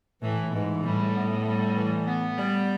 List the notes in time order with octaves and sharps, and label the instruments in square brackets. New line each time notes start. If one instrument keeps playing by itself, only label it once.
[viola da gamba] A2 [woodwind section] E3
[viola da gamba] G#2 [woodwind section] E3
[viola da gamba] A2 [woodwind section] G3
[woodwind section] B3
G3
E3
B3
G3